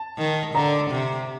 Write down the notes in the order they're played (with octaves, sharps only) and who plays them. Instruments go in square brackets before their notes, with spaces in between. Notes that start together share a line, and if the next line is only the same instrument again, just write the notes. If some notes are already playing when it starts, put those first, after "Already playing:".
Already playing: [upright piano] A5
[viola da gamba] D#3
[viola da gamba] D3 [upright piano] A#5
[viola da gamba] C3